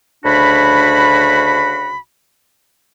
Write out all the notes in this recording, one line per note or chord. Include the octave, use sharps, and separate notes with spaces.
D2 C#3 D4 F#4 B5